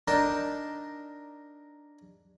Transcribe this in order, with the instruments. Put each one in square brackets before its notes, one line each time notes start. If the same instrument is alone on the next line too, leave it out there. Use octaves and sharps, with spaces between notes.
[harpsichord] D4 D#4 A#4 G5 A5